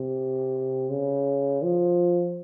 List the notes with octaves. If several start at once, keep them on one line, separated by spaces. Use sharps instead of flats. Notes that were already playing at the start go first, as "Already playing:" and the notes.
Already playing: C3
C#3
F3